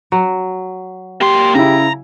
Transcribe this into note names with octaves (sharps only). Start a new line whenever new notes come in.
F#3
A#3 G4 C6
C#3 E4 A#5